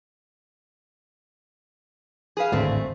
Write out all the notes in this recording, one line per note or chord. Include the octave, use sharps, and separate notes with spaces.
G#4 B4 F5
G#1 D2 A2 G#3 A3 C4